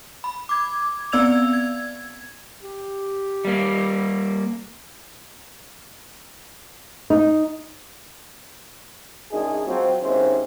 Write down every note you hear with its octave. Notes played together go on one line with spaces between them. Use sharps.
B5
D6 G#6
B3 C4 D5 E6 G#6 F7
G#6
G4
G3 A#3
D#4
F#2 A#2 D4 D#4 G#4
F3 F#3 G#3 C4
D#2 G#2 C4 C#4 E4 C5